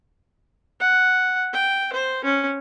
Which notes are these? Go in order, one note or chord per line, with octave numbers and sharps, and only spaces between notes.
F#5
G5
C5
C#4